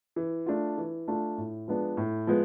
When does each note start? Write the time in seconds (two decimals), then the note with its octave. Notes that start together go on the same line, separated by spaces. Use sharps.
0.16 E3
0.46 A3 D4 F4
0.78 E3
1.08 A3 D4 F4
1.38 A2
1.68 F3 G#3 B3 D4
1.97 A2
2.27 F3 G#3 B3